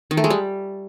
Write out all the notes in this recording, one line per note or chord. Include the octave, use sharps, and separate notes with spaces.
D#3
A3
G#3
G3